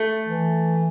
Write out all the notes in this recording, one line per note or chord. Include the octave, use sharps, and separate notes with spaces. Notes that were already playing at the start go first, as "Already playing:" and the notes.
Already playing: A3
E3